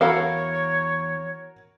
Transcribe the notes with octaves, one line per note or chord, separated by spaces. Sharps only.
E2 E4 F#4 A4 A#4 C#5 F5